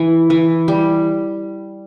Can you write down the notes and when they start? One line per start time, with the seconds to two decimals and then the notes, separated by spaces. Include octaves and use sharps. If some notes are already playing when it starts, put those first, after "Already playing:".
Already playing: E3
0.30 E3
0.68 G3